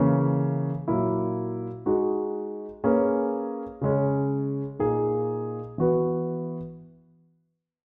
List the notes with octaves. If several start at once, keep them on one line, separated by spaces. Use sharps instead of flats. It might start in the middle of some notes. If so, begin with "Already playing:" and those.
Already playing: C#3 E3 A#3 C#4
A#2 F#3 A#3 E4
G#3 D#4 F#4
A#3 C#4 G#4 B4
C#3 G#3 C#4
A#2 A#3 D#4 G#4
E3 B3 F#4 B4